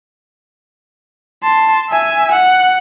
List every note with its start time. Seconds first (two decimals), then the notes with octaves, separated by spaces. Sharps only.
1.44 A5 C6
1.90 E5 G#5
2.32 F#5